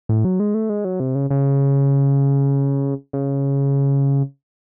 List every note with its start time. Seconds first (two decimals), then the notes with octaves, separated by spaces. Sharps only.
0.09 A2
0.25 F#3
0.40 G#3
0.54 A3
0.69 G#3
0.85 F#3
1.00 C3
1.15 C#3
1.30 C#3
3.13 C#3